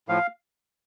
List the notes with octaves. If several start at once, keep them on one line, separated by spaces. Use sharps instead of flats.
A2 F3 F5